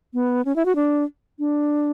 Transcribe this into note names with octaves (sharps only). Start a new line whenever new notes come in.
B3
C#4
E4
F#4
D4
D4